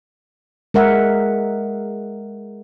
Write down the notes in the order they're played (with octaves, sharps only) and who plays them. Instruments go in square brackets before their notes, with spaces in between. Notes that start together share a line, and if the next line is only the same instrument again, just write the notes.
[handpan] G#3 A#4 E5 F#5